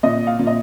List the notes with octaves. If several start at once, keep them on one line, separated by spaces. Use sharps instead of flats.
A#2 D#5
F5
A#2
D#5